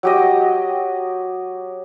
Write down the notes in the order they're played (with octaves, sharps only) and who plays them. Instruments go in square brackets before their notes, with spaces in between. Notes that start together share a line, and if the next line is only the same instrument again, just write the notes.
[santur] F#3 G4 D#5